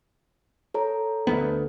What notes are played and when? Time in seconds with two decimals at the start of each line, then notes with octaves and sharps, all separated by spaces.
0.74 A4 C#5 A#5
1.27 D2 A#3 B3 A4